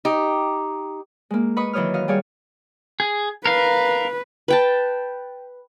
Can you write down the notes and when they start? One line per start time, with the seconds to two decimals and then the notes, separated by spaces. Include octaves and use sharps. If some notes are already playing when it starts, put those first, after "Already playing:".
0.05 D#4 G4
1.30 G#3 A#3
1.56 B4 D#5 B5 C#6 D#6
1.73 D#3 E3 F#3 C#5 D#6 F6
1.94 F#4 D#5 F5
2.08 G3 G4 G#4 C#5 F5
3.00 G#4
3.46 A#4 B4 F5
4.48 B4 G5 A5